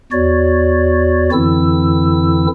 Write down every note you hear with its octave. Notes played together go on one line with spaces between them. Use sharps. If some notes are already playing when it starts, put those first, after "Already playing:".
E2 F#4 C#5 D5
F2 D3 E3 C4 E4 E6